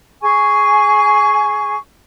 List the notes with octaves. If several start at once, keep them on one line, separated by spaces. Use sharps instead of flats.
G#4 G#5 C#6